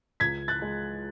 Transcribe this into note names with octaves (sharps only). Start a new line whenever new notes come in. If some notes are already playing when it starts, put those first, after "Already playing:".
C#2 G#6 B6
F#6 A6
G#3